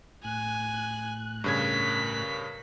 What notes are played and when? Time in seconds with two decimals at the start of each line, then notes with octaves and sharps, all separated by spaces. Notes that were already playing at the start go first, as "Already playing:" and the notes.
0.25 A2 G#5 F#6
1.44 G2 C#3 A#4 G#6 B6